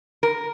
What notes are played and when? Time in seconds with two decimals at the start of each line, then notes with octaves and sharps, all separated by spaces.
0.23 A#4